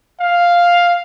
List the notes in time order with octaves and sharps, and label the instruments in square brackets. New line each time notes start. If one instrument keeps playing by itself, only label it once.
[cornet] F5